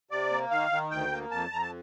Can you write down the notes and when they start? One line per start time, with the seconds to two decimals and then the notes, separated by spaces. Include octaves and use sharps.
0.11 C3 D5
0.31 A#3
0.51 D#3 F5
0.71 D#3
0.91 D2 G5
1.11 A#3
1.31 F2 A5
1.51 F2 A#5
1.62 A5